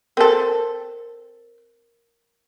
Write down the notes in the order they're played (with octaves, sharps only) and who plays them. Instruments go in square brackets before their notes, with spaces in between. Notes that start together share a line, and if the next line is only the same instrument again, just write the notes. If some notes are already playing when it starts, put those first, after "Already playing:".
[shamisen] C4 A4 [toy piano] A#4